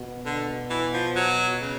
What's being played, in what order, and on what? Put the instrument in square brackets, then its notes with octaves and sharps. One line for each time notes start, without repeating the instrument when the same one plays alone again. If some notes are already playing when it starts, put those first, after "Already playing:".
Already playing: [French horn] B2
[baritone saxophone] D3
E3
F3
F#3
C#3